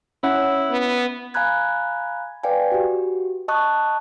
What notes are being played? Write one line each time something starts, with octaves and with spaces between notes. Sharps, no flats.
C#4 E4 F#5
B3
F5 G#5 A#5 B5 F#6 G#6
B4 D5 F5 G5 G#5
F#4 G4
D#5 A5 C#6 D#6 F#6